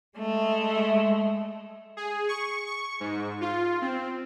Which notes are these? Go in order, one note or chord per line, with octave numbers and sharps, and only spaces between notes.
G#3 A3
G#4
C#6
C#6
G#2
F4
C4